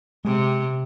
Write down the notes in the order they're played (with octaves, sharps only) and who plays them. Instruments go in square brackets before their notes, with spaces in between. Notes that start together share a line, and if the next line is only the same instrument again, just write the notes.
[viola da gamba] C3 [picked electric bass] G#3